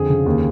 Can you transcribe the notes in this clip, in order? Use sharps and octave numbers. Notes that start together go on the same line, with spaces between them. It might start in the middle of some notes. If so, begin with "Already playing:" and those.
Already playing: F2 D3 G#4
C#3
D#2